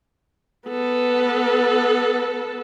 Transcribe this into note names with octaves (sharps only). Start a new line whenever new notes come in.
B3 A4